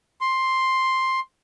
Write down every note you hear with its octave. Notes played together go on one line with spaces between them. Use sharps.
C6